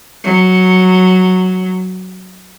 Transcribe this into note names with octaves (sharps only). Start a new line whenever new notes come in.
F#3